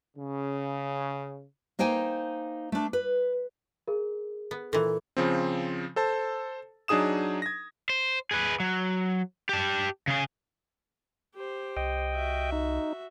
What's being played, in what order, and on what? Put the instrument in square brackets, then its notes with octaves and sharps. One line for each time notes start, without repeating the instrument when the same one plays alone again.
[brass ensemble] C#3
[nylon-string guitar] A#3 D#4 C5 G5 G#5
A3 D4
B4
[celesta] G#4 A#4
[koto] B3
[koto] A#2 E3 [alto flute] A4
[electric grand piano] C#3 F3 C4
A4 C5 A5
F#3 D4 D#4 G#4 D#6 E7
G#6 A#6
[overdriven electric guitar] C5
G#4 B4
F#3
G4 A5
C#3 G#4
[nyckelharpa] G4 C5
[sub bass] C2 [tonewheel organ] D#5 G5
[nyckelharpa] F#4 E5
[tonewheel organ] D#4